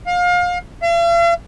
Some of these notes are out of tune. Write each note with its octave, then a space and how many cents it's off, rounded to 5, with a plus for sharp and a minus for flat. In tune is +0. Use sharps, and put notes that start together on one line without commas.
F5 +30
F5 -45